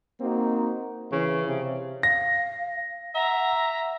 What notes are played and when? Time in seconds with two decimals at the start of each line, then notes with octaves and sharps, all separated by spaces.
0.21 A#3 C4 D#4 F#4
1.12 C#3 E3
1.48 C3
2.03 F5 A#6
3.15 E5 F#5 A#5